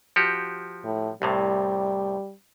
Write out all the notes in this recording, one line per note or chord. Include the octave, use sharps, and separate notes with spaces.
F3 F#4 G4
A2
C2 A2 C3 G3